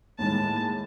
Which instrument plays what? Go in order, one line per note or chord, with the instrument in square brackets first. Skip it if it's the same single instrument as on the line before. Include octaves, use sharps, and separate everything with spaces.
[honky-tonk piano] D#2 A2 G#3 [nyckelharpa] A5